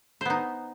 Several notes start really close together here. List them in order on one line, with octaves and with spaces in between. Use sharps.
C5 B3 D#4